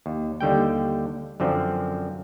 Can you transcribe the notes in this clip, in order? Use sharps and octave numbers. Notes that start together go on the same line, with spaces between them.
D#2
D#2 D3 G3 G5
F#2 D3 F3 C4